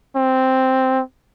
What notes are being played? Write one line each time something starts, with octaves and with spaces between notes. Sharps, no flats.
C4